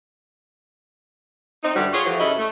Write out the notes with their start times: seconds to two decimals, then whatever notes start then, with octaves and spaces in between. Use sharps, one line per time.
1.63 C4 D#4
1.75 G2 D3 E3 G3 F#4
1.92 F4 F#4 G#4 C#5
2.05 E3 F3 A3 F#4 G4
2.19 F#2 C#3 E4 A4 D#5
2.37 A3